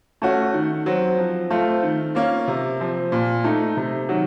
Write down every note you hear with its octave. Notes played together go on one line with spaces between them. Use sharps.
A3 C#4 F#4
D#3
F#3 C4
F3
A3 C4 F4
D#3
A#3 C#4 F4
C3
F3 C4
A#2
A3 D#4
C3
D#3 F#3